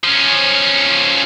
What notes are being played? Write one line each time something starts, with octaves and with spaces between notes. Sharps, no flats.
F3 C#4